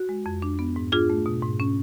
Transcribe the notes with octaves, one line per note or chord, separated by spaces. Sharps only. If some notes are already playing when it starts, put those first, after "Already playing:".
Already playing: F#4
G#3
F2
D4
B3
G#2
D4 F4 G#4
A3
B2
G#2
C#4